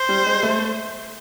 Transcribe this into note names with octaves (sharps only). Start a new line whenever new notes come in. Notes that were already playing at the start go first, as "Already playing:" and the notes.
Already playing: C5
G3
G#3
A3